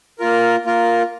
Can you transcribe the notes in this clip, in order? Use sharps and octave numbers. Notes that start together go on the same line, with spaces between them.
A#3 F4 A#4
A#3 F4 A#4